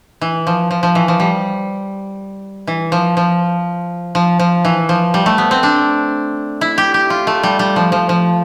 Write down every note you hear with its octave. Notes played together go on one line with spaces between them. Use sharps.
E3
F3
F3
F3
E3
F3
G3
E3
F3
F3
F3
F3
E3
F3
G3
A3
B3
C4
D4
E4
G4
G4
F4
A3
G3
G3
F3
F3
F3